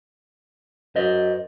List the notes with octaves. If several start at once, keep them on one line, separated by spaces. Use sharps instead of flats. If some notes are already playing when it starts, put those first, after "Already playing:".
F#2 C5 D#5